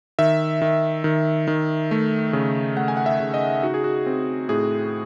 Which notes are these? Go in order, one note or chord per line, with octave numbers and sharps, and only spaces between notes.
D#3 E5
D#3
D#3
D#3
A3
C#3
A3 F#5
G#5
F#5
E5
C#3
D#5
D#4 F#4
G#4
F#4
C4
A2 G#4